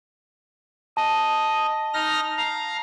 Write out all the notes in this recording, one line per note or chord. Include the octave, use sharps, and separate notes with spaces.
D#5 A5
D#4 F6 A#6
F5 A#5